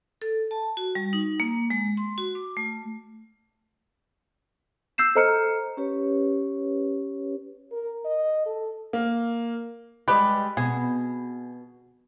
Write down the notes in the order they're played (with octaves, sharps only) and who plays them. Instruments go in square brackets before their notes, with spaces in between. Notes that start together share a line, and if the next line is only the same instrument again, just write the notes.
[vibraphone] A4
A5
F#4
G3
D#4
A#3
G#3
C6
F#4
D6
A3
[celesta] E6 G6 C7 E7
A4 C5 D#5 A#5 F6 C#7
[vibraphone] C#4 G4 B4 C#5
[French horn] A#4
D#5
A4
[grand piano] A#3
[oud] G3 G#3 [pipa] G4 B4
[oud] B2 [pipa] G#4